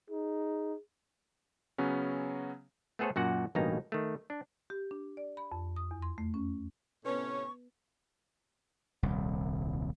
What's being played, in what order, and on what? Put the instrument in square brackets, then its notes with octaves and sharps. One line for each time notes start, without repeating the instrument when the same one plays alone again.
[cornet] D#4 [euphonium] G#4
[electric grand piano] C#3 F#3 B3 C#4
[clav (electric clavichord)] A3 B3 G#4 A4 C5 C#5
F#2 A#2 F#4 F#5
A1 G2 B2 A#3 D#4 A#5
D#3 A3
D4
[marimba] G4
D4
D5
B5
F2
D#6
E2
C6
A3
C#4
[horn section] A2 C3 C#4 [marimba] B3 B4 [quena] C#6
[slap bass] D#1 C2